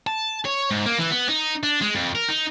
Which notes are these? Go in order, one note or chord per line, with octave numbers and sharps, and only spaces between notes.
A5
C#5
G#2
A#3
E3
B3
D#4
D4
G#3
F2
A#4
D#4